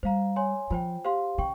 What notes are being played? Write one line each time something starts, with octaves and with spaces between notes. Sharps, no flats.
G3 C5 F5 A#5
C#5 G#5 C6
F3 F4 C5 G5
G4 C5 F5 C6
C#3 G5 C#6